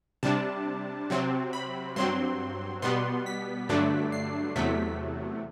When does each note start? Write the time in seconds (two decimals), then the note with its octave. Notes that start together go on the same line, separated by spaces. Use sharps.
0.23 C3 G3 D4 A5
1.10 C3 F#3 C4
1.53 B5
1.96 G2 F#3 C4 C6
2.82 B2 G3 B3 C6
3.26 B6
3.69 G2 D3 F#3 A3 D4
4.12 C7
4.56 E2 C3 F#3 A3 B6